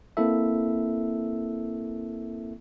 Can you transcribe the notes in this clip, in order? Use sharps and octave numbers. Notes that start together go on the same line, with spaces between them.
A#3 C4 E4 A4 E5